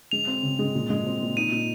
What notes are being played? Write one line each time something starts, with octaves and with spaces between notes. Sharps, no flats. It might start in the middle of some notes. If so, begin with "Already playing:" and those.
G#3 F7
C4
C#3
G#3
A#2
G#3
C4
A#2
D#4 D#7
A#2